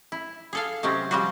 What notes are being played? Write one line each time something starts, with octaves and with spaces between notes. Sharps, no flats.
E4
G#4 A4 F5
C3 F#3 G#3 C4 C#4
F3 G3 F#4